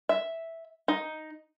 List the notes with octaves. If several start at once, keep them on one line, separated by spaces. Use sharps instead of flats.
E5
D#4